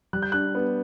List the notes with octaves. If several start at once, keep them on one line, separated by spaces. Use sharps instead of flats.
G3 F#6
G6
D4 F#6
B3